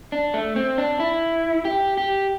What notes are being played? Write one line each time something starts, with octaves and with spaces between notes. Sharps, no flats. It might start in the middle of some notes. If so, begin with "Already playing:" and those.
D4
A3
C4
D4
E4
G4
G4